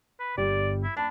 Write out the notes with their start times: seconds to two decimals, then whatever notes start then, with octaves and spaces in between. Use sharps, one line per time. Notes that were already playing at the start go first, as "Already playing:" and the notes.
0.20 B4
0.38 G1 G3 G4 D5
0.83 E4
0.97 D4 A5 B5